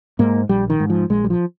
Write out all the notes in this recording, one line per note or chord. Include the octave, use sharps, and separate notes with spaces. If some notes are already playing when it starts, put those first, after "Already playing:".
G#2 A#3
A#1 G3
D#3
G#2
F3
A#1 G#3
G3
F3